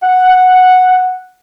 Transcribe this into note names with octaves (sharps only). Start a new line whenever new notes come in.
F#5